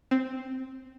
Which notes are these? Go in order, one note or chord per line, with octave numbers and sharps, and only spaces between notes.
C4